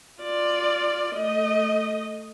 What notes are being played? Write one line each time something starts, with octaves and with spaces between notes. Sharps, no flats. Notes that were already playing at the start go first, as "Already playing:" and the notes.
F4 D5
A3 D#5